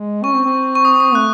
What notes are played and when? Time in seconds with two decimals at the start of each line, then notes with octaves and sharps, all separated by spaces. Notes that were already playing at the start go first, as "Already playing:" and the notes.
Already playing: G#3
0.24 C#4 C#6
0.34 C4
0.45 C4
0.75 C#6
0.85 D#6
1.00 D#6
1.15 A3 F#6